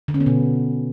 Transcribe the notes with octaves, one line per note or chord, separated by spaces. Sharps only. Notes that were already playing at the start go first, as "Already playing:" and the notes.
D3
C#4
B3
B2